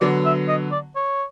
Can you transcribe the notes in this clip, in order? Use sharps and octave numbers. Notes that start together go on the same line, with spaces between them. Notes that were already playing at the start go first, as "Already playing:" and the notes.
D3 F#3 B3 D5
E5
D#5
D5
C#5